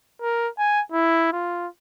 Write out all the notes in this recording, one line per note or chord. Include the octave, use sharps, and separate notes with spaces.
A#4
G#5
E4
F4